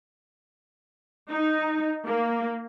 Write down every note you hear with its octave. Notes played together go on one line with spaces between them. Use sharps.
D#4
A#3